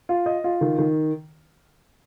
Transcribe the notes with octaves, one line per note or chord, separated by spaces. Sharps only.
F4
D#5
F4
D#3
D#3